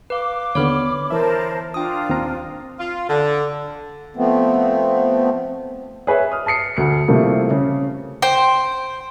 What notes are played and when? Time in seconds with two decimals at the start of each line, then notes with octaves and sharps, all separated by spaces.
0.10 B4 F5 D6
0.55 D#2 D3 B3 C#5 B5 F6
1.11 E3 A#4 C5 E5 A5
1.74 D4 F4 G5 D#6
2.09 D#2 C4 A#5
2.79 F4
3.09 D3
4.16 F3 A3 B3 C4
6.07 G#4 B4 C#5 E5
6.32 D#6 F6
6.46 A5 D#6 C7 C#7
6.77 D2 C#7
7.08 C3 E3 F3 G3 A3 A#3
7.51 C#3
8.22 C5 G5